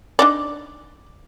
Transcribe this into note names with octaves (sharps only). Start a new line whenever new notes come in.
D4 D#4 D5